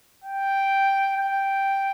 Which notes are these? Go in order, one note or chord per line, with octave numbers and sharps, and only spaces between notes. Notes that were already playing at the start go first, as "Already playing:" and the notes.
G5
G5